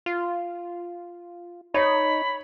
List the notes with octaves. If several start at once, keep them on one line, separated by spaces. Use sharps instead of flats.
F4
D#4 C#5 B5